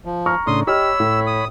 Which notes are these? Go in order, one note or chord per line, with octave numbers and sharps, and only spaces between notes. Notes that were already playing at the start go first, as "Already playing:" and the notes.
F3
A#5 C#6 F6
A2 C#3 D4 C6 D#6
G4 C#5 D#5 B5 E6 F6
A2
D#6